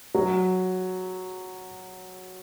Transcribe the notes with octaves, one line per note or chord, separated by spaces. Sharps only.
F#3